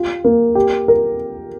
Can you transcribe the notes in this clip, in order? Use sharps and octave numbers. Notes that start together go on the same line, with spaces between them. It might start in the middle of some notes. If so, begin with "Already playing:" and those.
Already playing: F4 G4
A#3
G4
A#4